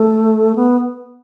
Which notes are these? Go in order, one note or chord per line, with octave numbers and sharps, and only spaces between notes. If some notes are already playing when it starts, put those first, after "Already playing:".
Already playing: A3
B3